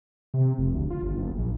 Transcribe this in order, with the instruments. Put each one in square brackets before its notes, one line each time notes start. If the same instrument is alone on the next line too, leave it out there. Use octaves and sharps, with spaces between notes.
[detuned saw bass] C3
F1
D2
F4
G1
F#1
A#1